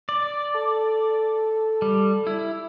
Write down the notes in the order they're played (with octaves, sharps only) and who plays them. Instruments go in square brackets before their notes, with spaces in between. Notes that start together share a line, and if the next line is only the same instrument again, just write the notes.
[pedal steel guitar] D5
[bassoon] A4
[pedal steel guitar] G3
E4